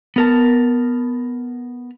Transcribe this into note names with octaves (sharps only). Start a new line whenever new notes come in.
B3 A#4 A5